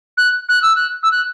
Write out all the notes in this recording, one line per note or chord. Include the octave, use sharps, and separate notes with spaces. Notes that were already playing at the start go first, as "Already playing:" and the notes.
F#6
F#6
E6
F#6
E6
F#6